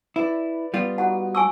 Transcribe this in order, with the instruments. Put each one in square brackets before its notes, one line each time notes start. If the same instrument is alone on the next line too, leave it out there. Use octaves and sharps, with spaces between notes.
[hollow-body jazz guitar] E4 [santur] B4 D5
[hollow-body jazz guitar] G3 B3 F4
[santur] D#4 F#4 [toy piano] F#5
[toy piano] G#5 C#6 E6